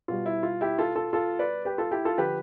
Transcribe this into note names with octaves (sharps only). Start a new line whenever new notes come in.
B2 G3 F4
E4
F4
E4 G4
F4 A4
F4 A4
F4 A4
B4 D5
G4 B4
F4 A4
E4 G4
F4 A4
D3 F3 G4 B4